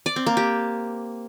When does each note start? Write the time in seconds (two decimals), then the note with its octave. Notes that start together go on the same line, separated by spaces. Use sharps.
0.06 D5
0.16 C4
0.27 A#3
0.37 G4